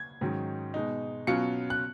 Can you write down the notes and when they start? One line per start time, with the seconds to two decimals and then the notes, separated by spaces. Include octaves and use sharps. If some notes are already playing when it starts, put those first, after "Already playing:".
Already playing: G#6
0.21 G#2 D#3 F#3 C#4
0.74 B2 G#3 D#4
1.27 B2 F#3 C#4 F4 C#7
1.70 F#6